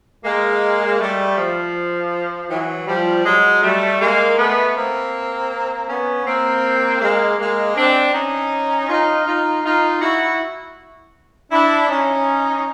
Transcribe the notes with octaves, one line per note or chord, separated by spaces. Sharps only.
G#3 A#3
G3 A3
F3
E3 F#3
F3 G3
F#3 G#3
G3 A3
G#3 A#3
A3 B3
A#3 C4
B3 C#4
A#3 C4
G#3 A#3
G#3 A#3
C4 D4
C#4 D#4
D#4 F4
D#4 F4
D#4 F4
E4 F#4
D4 E4
C#4 D#4